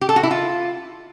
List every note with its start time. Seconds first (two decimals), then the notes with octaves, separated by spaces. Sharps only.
0.01 G4
0.09 A4
0.16 F#4
0.23 E4
0.31 F4